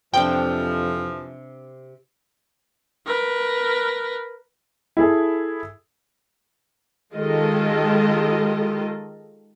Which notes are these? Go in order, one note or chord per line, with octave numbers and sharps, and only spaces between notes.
F2 C3 E3 F3 D4 G5
A#4 B4
E4 G#4 A4
D#3 G#3 F4 G4 A4 D#5